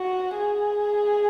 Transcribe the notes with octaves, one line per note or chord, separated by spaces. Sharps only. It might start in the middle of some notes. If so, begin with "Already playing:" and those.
Already playing: F#4
G#4